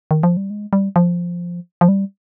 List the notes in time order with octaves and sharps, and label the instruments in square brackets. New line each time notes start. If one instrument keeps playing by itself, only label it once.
[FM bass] D#3
F3
G3
G#3
G3
F3
F3
G3